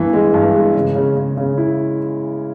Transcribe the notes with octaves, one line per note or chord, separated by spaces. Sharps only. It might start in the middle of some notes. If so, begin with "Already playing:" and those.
Already playing: G2 E3 B3
G#3
G2
G#3
C#3
C#3
C#3
C#3
E4